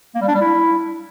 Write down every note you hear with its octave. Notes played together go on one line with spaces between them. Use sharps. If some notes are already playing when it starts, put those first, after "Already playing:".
A#3
G3
D4
G3
E4